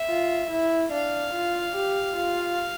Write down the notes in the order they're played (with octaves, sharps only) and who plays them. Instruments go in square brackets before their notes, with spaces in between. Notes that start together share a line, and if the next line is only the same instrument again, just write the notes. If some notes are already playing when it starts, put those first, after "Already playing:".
Already playing: [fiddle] E5
[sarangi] F4
E4
[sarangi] D4 [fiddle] F5
[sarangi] F4
G4
F4